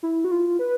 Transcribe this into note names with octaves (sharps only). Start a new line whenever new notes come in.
E4
F#4
F4
B4